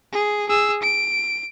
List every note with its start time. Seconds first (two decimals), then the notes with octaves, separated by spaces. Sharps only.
0.13 G#4
0.49 G#4 E6
0.82 D7